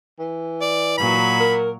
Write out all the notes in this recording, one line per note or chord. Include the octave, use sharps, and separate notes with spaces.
E3
D5
A#2 F#3 F#4 B5
A#4